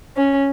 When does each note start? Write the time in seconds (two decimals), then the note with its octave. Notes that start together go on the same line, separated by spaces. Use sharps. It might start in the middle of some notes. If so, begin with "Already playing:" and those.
0.16 C#4